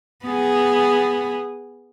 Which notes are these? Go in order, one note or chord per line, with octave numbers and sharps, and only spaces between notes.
B3 G#4